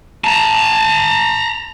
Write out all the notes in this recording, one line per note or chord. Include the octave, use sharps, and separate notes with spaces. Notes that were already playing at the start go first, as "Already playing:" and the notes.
A5 A#5